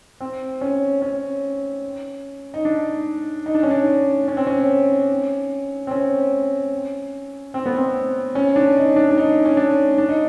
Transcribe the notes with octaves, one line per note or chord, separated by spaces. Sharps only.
C4
C#4
C#4
D#4
D4
D#4
D4
C#4
D4
C#4
C4
C#4
C4
C#4
C4
B3
C4
C#4
D4
D#4
D4
D4
D#4
C#4
D4
D4
D#4